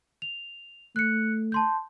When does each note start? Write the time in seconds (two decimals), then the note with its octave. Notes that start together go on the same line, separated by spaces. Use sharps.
0.22 F7
0.96 A3 F#6 C#7
1.52 A5 C6 G6